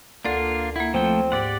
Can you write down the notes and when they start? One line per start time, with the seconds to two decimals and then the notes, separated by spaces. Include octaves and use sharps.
0.25 D2 A#3 D4 F4 A4 D5
0.76 A#3 E4 F#5
0.94 F3 A3 C4 G5
1.32 G#2 G4 D5 F#5